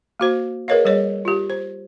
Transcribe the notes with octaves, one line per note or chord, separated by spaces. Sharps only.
A#3 F#4 C5
G#4 A#4 B4 C#5 D#5 F5
G3 G#4 C#5 D#5
F4 G4
C5